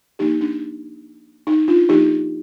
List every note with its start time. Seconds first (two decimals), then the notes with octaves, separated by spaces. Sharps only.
0.19 F3 A#3 D4 D#4 G4
0.41 D4
1.47 D#4
1.68 D4 F4
1.89 F3 A#3 D4 D#4 G4